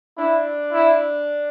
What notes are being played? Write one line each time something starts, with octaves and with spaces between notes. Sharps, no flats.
D4 E4
E4